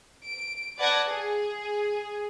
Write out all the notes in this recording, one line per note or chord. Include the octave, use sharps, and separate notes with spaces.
D7
B4 D5 F#5 A5 G#6 A#6
G#4